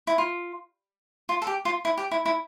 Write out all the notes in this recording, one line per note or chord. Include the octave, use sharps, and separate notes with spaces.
E4
F4
F4
A4
G4
F4
E4
G4
E4
E4